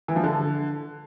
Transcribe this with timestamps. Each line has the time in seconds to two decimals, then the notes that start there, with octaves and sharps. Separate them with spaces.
0.08 E3
0.16 F3
0.24 D3